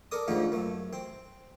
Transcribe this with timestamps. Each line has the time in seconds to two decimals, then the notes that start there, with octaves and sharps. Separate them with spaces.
0.12 A4 A#4 D5 D#6
0.28 D2 G#2 D3 F3 A3
0.52 F#2 A3
0.93 C4